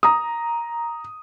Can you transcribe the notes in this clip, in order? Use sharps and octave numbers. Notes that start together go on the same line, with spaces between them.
A#5 D#6